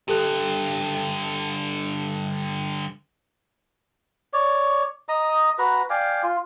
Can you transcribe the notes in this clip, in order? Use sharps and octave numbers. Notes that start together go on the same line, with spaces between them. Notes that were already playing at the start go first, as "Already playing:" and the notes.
G2 D3 G4 A4 F#6
C#5 D5
D#5 A#5 D#6
F#4 B4 A#5
D5 F5 G5 G#5
F4